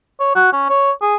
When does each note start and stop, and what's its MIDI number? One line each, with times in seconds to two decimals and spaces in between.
0.20 0.33 73
0.35 0.51 66
0.52 0.68 61
0.69 0.91 73
1.02 1.16 68